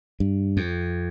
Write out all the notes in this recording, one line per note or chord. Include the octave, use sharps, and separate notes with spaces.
G2
F2